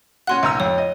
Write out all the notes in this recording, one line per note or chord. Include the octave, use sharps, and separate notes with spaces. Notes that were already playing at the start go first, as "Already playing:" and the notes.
C#4 F#4 F#5 C6 F#6
B1 A#5 E6
F2 C#5
D#5